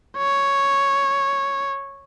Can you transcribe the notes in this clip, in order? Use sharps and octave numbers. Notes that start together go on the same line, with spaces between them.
C#5